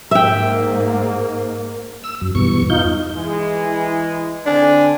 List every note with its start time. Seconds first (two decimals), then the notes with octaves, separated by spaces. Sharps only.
0.11 G#2 A#3 E5 G5
2.04 E6
2.21 F#2
2.35 E2 G2 B2 C#6
2.70 D#4 F4 G6
3.15 E3 G#3
4.46 D3 C4 D4 G#5